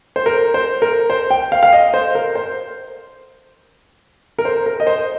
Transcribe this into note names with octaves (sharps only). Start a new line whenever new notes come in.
C5
A#4
C5
A#4
C5
G5
F5
F5
D#5
C5
A#4
C5
A#4
C5
A#4
D#5
C5